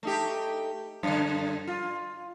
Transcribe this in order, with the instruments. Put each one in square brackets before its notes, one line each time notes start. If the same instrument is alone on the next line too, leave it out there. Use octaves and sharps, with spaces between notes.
[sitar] A3 D#4 G4
F#2 D3
F4